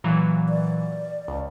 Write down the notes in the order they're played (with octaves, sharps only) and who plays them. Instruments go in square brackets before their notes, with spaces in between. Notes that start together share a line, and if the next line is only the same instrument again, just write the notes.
[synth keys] A#2 E3 F#3
[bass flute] D5
[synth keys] C#2